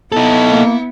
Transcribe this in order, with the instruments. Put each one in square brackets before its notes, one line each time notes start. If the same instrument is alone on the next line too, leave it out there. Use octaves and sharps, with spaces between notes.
[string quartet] B3 E4 [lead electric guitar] D#4 A4
[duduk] A#3